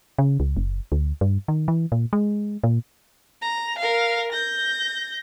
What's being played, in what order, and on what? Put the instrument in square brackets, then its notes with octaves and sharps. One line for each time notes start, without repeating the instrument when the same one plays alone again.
[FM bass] C#3
C#2
F#1
D2
G2
D#3
E3
A#2
G#3
A#2
[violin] A#5
A#4 F5
G6 A#6